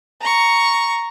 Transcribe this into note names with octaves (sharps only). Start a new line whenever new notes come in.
A#5 C#6